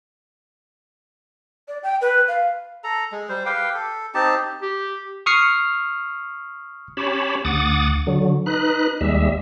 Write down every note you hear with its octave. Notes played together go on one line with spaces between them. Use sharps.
D5
G5
B4
F5
A4 A#5
G#3
G3 C5
G4 B4 F5 G5
A4
C4 D#4 G4 A5
G4
C#6 D#6 F6 C7 C#7
C#4 G4 C#5 A5 B5
D2 F#5 D6 D#6 A6
D3 F#3
D#4 B4 F#6
D#2 G3 G#3 E5